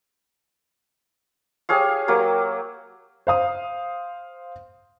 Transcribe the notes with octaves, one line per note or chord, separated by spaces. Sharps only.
G4 G#4 C#5 F5
F#3 A#3 G4
C5 F5 D#6